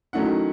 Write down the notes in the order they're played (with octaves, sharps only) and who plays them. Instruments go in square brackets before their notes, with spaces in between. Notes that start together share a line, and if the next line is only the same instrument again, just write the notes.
[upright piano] D#3 F#3 A3 C#4 E4 F#5